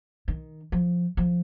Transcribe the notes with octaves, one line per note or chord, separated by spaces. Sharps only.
D#3
F3
F3